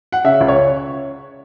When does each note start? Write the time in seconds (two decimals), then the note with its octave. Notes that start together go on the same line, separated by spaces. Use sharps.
0.12 F#5
0.24 C#3 E5
0.40 C#2
0.48 C#5